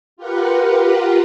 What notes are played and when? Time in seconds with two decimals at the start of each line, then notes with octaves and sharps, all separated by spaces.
0.17 F4 G4 A#4 B4 F#5